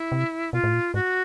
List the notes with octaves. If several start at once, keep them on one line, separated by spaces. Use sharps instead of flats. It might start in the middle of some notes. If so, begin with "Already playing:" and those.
Already playing: E4
C3
B2 F4
A2
A#2
G#2 F#4